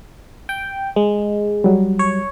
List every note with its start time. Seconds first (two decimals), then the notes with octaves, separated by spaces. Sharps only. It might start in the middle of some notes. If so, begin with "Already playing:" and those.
0.49 G5
0.96 G#3
1.64 F#3 G3
1.99 C#5